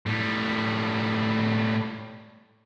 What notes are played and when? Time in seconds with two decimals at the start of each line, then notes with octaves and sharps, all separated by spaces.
0.06 A2 G3